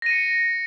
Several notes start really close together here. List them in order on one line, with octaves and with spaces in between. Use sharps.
A#6 D#7 C#7